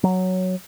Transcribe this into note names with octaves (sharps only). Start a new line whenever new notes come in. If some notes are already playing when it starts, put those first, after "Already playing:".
F#3